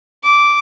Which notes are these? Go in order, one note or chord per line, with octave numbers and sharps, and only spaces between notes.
D6